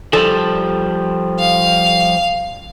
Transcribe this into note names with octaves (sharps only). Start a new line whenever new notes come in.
F3 G3 A4 D5 A5
F5